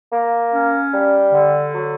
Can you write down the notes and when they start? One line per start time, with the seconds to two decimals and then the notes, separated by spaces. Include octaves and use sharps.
0.12 A#3
0.52 C#4
0.92 G3
1.32 D3
1.73 F#3